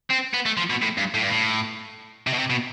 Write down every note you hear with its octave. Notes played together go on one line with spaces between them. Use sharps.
C4
B3
A3
F3
B2
A2
G2
A2
G2
A2
C3
B2
C3
B2